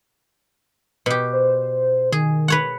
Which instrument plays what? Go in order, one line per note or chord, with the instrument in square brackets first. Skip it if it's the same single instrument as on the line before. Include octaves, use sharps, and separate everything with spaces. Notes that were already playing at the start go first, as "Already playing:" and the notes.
[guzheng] B2 G4
[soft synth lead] C5
[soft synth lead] D#3 [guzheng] G#4
[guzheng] B4 C#5 F#5